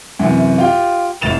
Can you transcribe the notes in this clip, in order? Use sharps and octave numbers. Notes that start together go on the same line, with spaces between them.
F#2 C3 E3
F4 G4 G5
F1 A2 A6 E7 F7